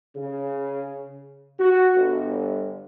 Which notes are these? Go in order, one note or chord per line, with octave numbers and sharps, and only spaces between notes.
C#3
F#4
G1